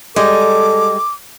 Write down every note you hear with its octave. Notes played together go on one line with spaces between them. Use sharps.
G3 G#3 A4 D#5 D6